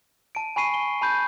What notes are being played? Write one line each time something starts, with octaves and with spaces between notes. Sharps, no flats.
A5 D7
G#5 B5 C#6 C7 D#7
G7
A5 B5 G6